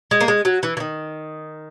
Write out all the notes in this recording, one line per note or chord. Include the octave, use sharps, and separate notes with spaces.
G#3
A#3
G#3
F#3
E3
E3
D#3